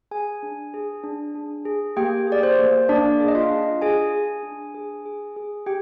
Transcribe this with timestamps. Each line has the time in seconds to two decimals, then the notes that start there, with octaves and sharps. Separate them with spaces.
0.11 G#4 G#5
0.43 D4
0.74 G#4
1.04 D4
1.35 D4
1.65 G#4
1.97 A#3 G4 G5
2.27 G#4
2.32 D5
2.43 C5
2.59 A#3
2.89 A#3 D4 D5
3.20 G#4
3.28 D#5
3.35 F4 F5
3.50 D4
3.81 G#4 G#5
4.13 G#4
4.43 D4
4.74 G#4
5.06 G#4
5.36 G#4
5.66 G4 G5